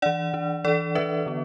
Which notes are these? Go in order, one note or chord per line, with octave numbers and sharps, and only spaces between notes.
E3 D4 D5 F#5
E3 D4
E3 D4 A4 D5
E3 D4 B4 E5
D3 B3